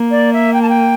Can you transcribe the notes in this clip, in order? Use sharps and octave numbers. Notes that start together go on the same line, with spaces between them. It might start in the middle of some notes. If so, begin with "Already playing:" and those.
Already playing: A#3
D5
E5
G5
A5
G5